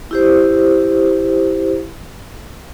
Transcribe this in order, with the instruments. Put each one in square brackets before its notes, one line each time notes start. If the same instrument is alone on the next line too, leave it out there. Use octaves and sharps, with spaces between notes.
[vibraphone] E4 G4 C5